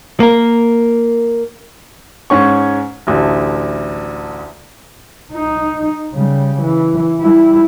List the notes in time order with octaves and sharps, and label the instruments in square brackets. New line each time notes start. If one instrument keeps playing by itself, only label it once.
[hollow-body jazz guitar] A#3 A#4
[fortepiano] G#2 C#4 C#6
A1 D2
[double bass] D#4
C#3 G3
E3
G3 E4